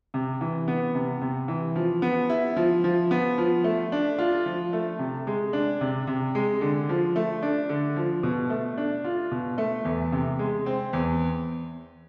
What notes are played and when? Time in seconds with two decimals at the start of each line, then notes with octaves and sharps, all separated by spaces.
0.14 C3
0.41 E3
0.68 B3
0.95 C3
1.21 C3
1.48 E3
1.76 F3
2.02 B3
2.30 E4
2.56 F3
2.84 F3
3.11 B3
3.38 F3
3.64 A3
3.92 D4
4.18 F4
4.46 F3
4.73 A3
4.99 C3
5.27 G#3
5.53 D4
5.81 C3
6.07 C3
6.35 G#3
6.61 D3
6.89 F3
7.16 A3
7.42 D4
7.69 D3
7.96 F3
8.23 B2
8.50 A3
8.78 D4
9.04 F4
9.31 B2
9.58 A3
9.85 E2
10.12 C3
10.39 G#3
10.66 C4
10.93 E2